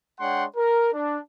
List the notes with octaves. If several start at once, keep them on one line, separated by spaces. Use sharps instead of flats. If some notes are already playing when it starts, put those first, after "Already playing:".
G#3 D4 C#5 F#5 G5 C6
A#4
D4